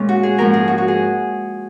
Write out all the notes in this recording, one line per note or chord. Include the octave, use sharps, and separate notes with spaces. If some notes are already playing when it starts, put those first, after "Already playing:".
Already playing: A#2 G#3 C#4
F#4
G#4
G#2 F3 A#3 C#4 A#4
G#4
F#4
F#4
G#4